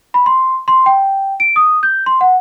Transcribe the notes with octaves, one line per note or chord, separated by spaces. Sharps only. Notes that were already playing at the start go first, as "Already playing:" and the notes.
B5
C6
C6
G5
D7
D#6
G6
C6
F#5